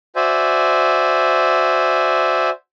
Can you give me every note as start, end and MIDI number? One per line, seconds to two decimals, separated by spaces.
0.16 2.50 66
0.16 2.50 72
0.16 2.50 74
0.16 2.50 76
0.16 2.50 80